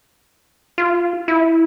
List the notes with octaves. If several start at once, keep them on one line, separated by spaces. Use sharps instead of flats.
F4
E4